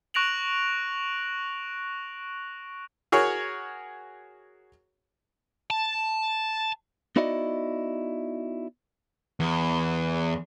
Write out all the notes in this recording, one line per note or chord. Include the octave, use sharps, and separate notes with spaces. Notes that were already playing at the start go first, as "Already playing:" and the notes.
C#6 F#6 A#6 D7 F7 F#7
F#4 G#4 A#4 C#5
A5
B3 D#4 E4 F#4 D5 D#5
E2